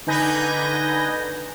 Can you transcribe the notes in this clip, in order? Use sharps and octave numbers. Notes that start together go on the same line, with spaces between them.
D3 D#4 B4 G#5 G6 A#6